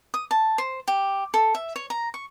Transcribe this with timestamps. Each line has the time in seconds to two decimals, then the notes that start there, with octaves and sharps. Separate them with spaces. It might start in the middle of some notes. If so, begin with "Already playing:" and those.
0.14 D#6
0.31 A5
0.58 C5
0.88 G4
1.34 A4
1.55 E5
1.76 C#5
1.90 A#5
2.14 C#6